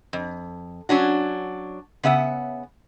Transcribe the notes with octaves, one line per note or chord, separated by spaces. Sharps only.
F2
F#3 C#4 D4 F#4
C#3 B3 E5 F#5